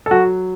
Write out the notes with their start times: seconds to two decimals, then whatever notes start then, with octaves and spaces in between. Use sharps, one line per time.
0.06 A4
0.11 F#3 F#4